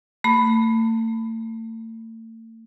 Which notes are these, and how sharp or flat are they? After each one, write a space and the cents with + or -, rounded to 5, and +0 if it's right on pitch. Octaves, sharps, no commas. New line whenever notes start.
A3 +40 B5 +5